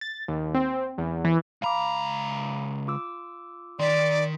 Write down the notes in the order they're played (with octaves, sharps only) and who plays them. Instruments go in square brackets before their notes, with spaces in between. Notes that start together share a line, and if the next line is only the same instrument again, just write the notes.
[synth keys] A6
D#2
C4
E2
E3
[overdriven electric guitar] C#2 A#5 [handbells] F5 B5 D6
[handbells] F4 D6 E6
[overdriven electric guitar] D#3 [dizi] D5 [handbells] C6 B6